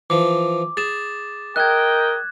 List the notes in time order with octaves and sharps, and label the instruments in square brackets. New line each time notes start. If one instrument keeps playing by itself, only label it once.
[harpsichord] E3 F3 [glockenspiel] D6
[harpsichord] G#4 [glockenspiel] A6 E7
[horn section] A#4 D#5 G5 [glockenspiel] F#6 G#6